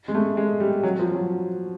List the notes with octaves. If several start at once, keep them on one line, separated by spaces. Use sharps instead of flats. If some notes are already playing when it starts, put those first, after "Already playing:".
G#3
A3
G#3
G3
F#3
F3
F#3